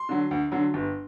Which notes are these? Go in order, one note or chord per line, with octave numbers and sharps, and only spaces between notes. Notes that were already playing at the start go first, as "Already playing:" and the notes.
Already playing: C6
D3 F#3
D2
D3 F#3
G1